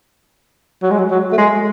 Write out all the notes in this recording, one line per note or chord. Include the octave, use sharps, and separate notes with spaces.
F#3
G#3
F#3
F#3
A3
G#3